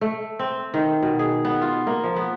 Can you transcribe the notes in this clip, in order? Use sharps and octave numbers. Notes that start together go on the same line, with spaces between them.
A3
C4
D#3
B2
G#4
B3
F4
A#3
F3
B3